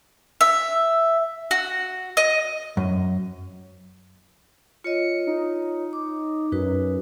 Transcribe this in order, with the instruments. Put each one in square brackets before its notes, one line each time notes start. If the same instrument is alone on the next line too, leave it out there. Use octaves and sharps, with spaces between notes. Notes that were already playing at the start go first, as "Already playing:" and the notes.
[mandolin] E5
F#4
D#5
[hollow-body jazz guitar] F#2
[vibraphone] F4 C#5 D#5 [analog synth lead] C#7
[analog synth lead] D#4
[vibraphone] D6
[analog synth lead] F#2 [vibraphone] D#4 F#4 B4